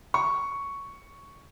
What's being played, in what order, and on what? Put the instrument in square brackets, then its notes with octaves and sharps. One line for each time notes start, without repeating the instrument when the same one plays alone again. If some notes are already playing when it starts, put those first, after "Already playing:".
[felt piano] C#6